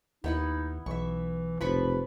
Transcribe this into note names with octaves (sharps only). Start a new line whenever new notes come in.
D#2 B3 D#4 E4 F#5
B1 E3 E5 C#6
F1 F3 B4 B5 C#6